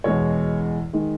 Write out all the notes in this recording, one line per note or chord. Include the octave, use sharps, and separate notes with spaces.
E2 B2 G#3 C#5
D#3 G#3